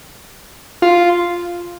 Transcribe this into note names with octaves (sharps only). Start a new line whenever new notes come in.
F4